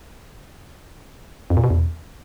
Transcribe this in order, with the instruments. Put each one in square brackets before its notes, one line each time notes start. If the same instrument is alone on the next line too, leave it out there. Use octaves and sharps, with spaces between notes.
[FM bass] F2
A#2
B2
E2